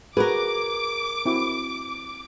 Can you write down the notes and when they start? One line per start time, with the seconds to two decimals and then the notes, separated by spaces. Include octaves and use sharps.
0.17 F#4 G#4 A#4 B4 D6
1.26 C4 E4 F#4